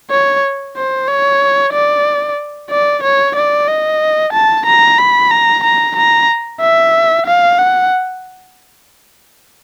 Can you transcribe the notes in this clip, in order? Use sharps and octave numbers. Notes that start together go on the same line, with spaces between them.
C#5
C5
C#5
D5
D5
C#5
D5
D#5
A5
A#5
B5
A#5
A#5
A#5
E5
F5
F#5